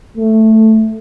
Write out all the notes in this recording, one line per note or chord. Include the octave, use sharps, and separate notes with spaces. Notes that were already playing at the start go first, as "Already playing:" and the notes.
A3